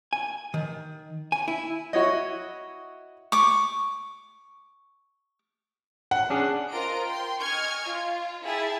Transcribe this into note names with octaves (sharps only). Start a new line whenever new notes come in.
G#5
D#3
G#5
E4
E4 F#4 C#5 D#5
C#6 D6
F#5
C#4 D4 G#4
F4 A#4 C5 D#5 A#5 D7
G5 C6
D#5 G#5 C#6 F6 G#6
F4
E4 G#4 E5 G5 A5 A6